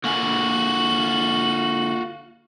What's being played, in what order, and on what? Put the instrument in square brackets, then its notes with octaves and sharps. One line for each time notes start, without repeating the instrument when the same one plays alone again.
[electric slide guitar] D3 A#3 G#5 [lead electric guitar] F4 F#4 [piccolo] F#7